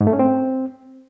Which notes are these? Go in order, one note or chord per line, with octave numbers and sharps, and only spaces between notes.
G#2
A3
C#4
C4